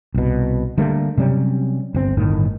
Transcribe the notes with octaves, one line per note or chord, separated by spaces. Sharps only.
C2 B2
D3 G3 A3 A#3
C3 F#3 G3 C#4
G1 C4
G1 A2 D#3